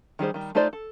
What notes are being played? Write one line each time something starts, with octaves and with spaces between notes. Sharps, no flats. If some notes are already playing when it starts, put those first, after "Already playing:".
D#3 G3 G#4 C5
D#3 G3
A3 D#4 F4 C5 D5
A4